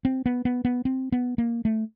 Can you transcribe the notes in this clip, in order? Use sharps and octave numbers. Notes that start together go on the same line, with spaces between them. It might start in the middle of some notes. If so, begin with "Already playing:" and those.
C4
B3
B3
B3
C4
B3
A#3
A3